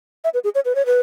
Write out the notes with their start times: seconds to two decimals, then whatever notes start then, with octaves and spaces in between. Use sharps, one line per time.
0.24 E5
0.34 B4
0.44 G#4
0.55 C#5
0.65 B4
0.75 C#5
0.86 B4